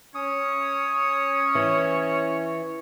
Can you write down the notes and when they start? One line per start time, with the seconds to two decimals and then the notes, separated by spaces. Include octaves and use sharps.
0.15 C#4 C#5 D#6
1.55 E3